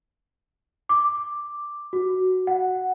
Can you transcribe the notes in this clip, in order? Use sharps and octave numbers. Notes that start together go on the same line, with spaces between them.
D6
F#4
F#5